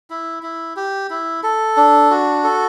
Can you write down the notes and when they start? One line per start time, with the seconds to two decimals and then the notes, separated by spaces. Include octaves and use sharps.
0.10 E4
0.43 E4
0.76 G4
1.10 E4
1.43 A4
1.77 D4
2.11 F#4
2.44 A4